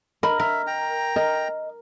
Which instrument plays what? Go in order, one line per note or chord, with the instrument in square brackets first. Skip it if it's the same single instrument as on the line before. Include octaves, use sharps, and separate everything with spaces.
[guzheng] A#4 [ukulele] D#5 B5
[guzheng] A#4 [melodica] E5
[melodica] G5 A#5
[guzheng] A#4 [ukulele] D#5